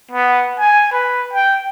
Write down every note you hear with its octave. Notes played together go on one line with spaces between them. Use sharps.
B3
G#5
B4
G5